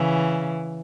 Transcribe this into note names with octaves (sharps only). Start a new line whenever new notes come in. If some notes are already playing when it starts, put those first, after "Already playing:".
Already playing: C#3 E3